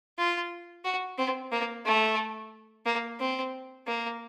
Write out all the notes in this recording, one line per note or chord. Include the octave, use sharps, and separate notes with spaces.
F4
F#4
C4
A#3
A3
A#3
C4
A#3